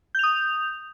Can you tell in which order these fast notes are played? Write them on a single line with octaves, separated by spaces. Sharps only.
G6 F7 D#6